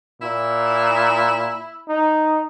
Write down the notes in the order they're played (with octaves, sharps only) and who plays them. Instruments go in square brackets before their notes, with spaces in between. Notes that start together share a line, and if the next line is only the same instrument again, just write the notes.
[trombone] A#2 [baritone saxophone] E4
[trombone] D#4